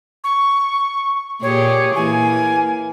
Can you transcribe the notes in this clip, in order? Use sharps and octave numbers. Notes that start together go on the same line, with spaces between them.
C#6
A#2 G4 G#4 C#5
E3 A#3 G#5